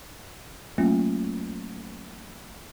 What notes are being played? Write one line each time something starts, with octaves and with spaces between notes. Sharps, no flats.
F#3 A3 A#3 C#4 F4